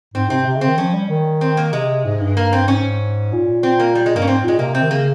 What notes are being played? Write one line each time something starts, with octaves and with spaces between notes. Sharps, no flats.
G#2 C4
C3 C4
C3
C#3
C4
D#3
F3 C#4
G3
D#3
C4
A#3
C3 G#3
G#2
G2
A#3
C4
G#2 C#4
A#2
C4
A#3
G3
G#3
G2 A#3
C#4
G#2 C4
A#2 G#3
C3 A#3
C4
D#3
C#3 A#3